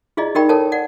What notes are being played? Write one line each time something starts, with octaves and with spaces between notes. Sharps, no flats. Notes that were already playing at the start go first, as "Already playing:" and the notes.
E4 F4 G#4 D5 D#5
D#4 G4 A#4 D5 G5 B5
A4 A#4 C#5 A5
D5 F#5